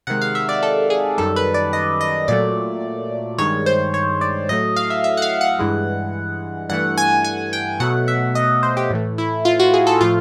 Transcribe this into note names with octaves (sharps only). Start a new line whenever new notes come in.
C3 D#3 G#3 F#5
F5
E5
D5
A4
G#4
F#2 D#3 G3 A4
B4
D5
D#5
D#5
A#2 F#3 A3 D5
G2 D#3 G#3 C#5
C5
C#5
D5
A2 F#3 A3 D#5
F5
E5
E5
F#5
F5
F#5
G2 E3 G#3
G2 E3 A3 F#5
G#5
G#5
G5
B2 F#3 A3 F#5
E5
D#5
C5
G4
A2 E3 A3
E4
F4
F#4
G#4
A4
A2 F3 A3 F4